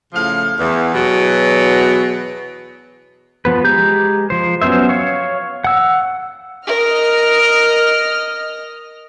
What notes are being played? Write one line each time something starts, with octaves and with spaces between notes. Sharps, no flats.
A2 C#3 F3 F5
E2
E2 B2 F#3
F3 B3 B4
G#3 G4 A#5 G6
F3 C5
F#3 B3 C#4 C5 E5
C#5 F5 C#6
F#5 E6
A#4 D#5 F6